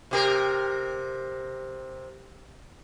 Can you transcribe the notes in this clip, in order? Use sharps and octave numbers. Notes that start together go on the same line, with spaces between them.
C3 G4 A#4